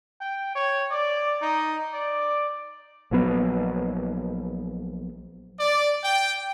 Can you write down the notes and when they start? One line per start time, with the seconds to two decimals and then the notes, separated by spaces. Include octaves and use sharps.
0.21 G5
0.55 C#5
0.91 D5
1.42 D#4
1.93 D5
3.11 A#1 F3 F#3 B3
5.60 D5
6.03 G5